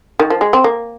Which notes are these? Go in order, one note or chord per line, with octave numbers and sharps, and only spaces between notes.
D#3
F3
G#3
C4
A#3